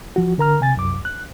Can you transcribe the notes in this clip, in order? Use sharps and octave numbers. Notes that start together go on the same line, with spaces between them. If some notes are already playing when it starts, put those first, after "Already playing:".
F3 F#4
D3 A#4 A#5 F6
C3 G#5 A6
C2 F#2 D6
F#6